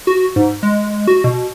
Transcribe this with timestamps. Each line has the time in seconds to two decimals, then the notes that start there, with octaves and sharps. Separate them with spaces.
0.07 F#4
0.36 G#2
0.63 G#3
1.07 F#4
1.24 B2